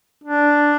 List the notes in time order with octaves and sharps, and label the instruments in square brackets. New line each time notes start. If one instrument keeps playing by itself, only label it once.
[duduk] D4